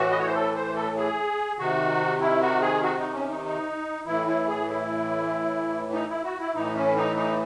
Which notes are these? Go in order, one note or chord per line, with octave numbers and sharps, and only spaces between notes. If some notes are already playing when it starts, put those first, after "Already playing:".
Already playing: A2 E3 F#4
D#5
C#5
C5
A4
C5
A4
G#4
C3 D#3 F#4
E4
F#4
G#4
F#4
D#4
C#4
D#4
D#4
A2 E3 E4
E4
G#4
E4
D#4
E4
F#4
E4
A2 E3 D#4
C#4
D#4
D#4